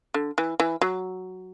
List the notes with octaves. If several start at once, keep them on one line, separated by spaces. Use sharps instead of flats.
D3
E3
E3
F#3